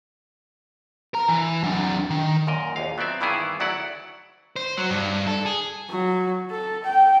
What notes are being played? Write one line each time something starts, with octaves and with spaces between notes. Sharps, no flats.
A#4 A#5
E3
F#3 D4
D#3
F#2 A#2 A#4 D#5
A#1 D#2 F5
F#3 B3 C4 D5 E5
G2 D#3 E3 B3 E4 G#4
D2 F#3 E4 D5 F#5
C5
F#3
G2
A4
G#4
F#3
A4
G5